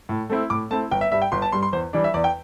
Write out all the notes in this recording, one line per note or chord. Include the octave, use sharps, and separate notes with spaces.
A2
A3 C4 E4
A2 D6
A3 C4 E4 A5
G1 G5
E5
G2 G3 E5
G5
G1 C6
A5
G2 G3 C6
C6
E2 C5
E3 G3 D4 D5
E5
E2 D5
G5